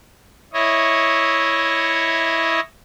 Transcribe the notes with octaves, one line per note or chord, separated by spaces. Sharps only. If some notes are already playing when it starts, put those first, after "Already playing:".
E4 C#5 D#5